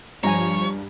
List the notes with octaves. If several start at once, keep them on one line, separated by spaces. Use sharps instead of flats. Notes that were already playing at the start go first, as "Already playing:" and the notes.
G2 F3 C#5 G#5 A#5